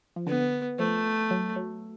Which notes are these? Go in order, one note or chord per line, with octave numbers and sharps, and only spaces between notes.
F3
D3 B3
F3 A3
F#3
F#3